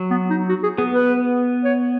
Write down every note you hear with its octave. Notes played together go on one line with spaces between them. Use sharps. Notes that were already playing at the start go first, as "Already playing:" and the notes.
Already playing: F#3
B3
D#4
F#4
G#4
B3 G#4
B4
C#5